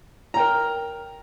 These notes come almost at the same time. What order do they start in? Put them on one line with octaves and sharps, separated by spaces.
A#5 G5 A#4